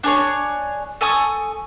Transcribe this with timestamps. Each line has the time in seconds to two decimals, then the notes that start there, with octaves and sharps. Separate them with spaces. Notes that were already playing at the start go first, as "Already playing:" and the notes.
0.03 D4 G#4 B4 C#5
1.01 A4 G#5 C#6 D#6